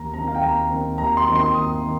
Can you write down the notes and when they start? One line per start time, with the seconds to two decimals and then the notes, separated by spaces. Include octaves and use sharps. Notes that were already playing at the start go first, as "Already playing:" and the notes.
Already playing: D#2 A#5
0.14 D#3 C4 A#5
0.28 F5
0.35 G5
0.42 D#2 A#5
0.70 D#3 C4
0.98 D#2 A#5
1.17 C6
1.26 D#3 C4
1.35 C6
1.54 D#2 D#6
1.82 D#3